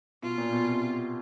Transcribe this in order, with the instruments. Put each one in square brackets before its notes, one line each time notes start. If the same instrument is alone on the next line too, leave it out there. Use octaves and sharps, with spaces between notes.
[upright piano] B2 [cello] F4
[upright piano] A#2
B2
C3